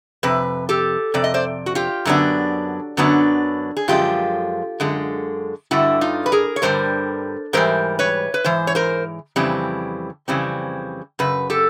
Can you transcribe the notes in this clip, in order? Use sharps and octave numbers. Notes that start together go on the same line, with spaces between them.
F2 C3 B4
G4 A4
F2 C3 D5
D#5
C5 D5
F#4
F4 G4
F#2 D3 F#3 B3 D4
F#2 D3 F#3 B3 D4
G#4
F#2 D3 F3 G#3 F4 G4
F#2 D3 G#3
G2 D3 G3 E4 F#4
D#4 F4
B4
G#4 A#4
C#5
G2 D3 G3 A#4 C5
G#2 E3 G3 A#4 C5
B4 C#5
B4
G#2 E3 C5
C#5
A#4 C5
F2 C#3 E3 G3 C4
F2 C#3 E3 G3 C4
F#2 C#3 B4
G4 A4